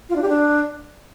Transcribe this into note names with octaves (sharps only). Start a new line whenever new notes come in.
F4
D4
G4
D4